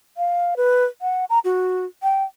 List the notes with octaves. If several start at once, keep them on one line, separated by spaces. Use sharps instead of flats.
F5
B4
F#5
A#5
F#4
G5